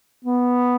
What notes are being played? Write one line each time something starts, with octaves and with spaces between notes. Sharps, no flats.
B3